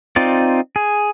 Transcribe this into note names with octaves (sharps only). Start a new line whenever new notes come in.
C4 D#4 F4 D5
G#4